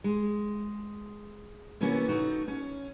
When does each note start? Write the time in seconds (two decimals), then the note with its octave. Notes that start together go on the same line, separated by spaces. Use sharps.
0.04 G#3
1.81 C3 E3 A#3 B3 C#4 F#4
2.08 A3 D#4 F#4
2.48 C#4